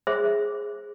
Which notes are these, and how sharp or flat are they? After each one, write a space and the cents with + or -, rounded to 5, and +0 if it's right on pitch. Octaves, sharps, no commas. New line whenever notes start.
G#4 +0 C5 +30 E5 +0